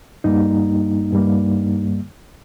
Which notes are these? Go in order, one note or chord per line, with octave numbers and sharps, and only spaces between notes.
G2 G3 A#3 D#4
G2 G3 A#3